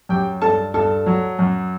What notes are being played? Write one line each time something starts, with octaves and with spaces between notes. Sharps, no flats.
F#2 G4 G5
G2 A4 A5
G2 A4 A5
F#3
F#2